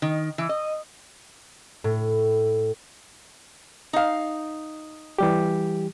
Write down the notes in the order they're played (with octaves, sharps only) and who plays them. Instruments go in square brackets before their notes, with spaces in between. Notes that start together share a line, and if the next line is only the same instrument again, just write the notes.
[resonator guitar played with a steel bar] D#3
E3
D#5
[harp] A2
[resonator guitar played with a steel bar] D#4 F5
[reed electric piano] E3 G3 G4